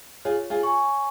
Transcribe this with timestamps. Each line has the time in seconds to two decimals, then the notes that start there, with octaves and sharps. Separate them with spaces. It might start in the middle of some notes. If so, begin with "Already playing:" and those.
0.25 F4 G#4 C#5
0.50 F4 G#4
0.63 G#5 C#6